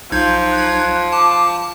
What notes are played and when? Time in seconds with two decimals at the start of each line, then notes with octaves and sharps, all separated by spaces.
0.12 B1 F3 D#4 G6 G#6
0.51 F#6
1.12 A5 D6